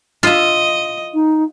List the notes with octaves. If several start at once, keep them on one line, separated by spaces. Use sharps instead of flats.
F4 D#5 E5
D#4